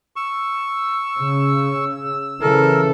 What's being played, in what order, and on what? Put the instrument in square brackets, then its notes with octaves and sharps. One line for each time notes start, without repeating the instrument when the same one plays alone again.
[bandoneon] C#6 [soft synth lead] E6
[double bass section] C#3
[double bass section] C#3 E3 [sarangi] A4 [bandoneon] A#4